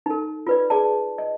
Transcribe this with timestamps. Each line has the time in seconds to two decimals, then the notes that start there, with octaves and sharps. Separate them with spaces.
0.06 D#4 A4
0.47 F4 B4 D5
0.70 G#4 D5 A5
1.18 D#5